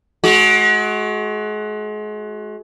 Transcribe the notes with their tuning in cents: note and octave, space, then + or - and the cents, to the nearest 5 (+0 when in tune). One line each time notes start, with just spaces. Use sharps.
G#3 +35 F#4 +0